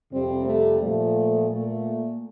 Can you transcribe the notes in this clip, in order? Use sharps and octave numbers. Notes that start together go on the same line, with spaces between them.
F2 C3 G3 C4
A3
A#2 F3 A3
A#2 A3